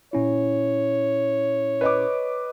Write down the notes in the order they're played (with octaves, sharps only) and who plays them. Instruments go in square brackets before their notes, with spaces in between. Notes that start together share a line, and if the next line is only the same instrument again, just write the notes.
[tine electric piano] A#2 C#4 E4 [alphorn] C#5
[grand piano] B4 D#5 D6